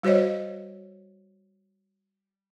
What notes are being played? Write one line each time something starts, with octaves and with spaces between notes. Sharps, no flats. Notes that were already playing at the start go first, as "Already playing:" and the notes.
G3 F#4 C5 C#5 D#5